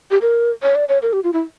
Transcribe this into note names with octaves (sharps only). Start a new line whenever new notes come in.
G4
A#4
C#5
D5
C#5
A#4
G4
F4
E4